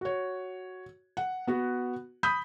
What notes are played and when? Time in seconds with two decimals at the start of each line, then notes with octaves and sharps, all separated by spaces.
0.01 F#4 C#5
1.17 F#5
1.47 B3 F#4
2.23 B5 D#6 G6 B6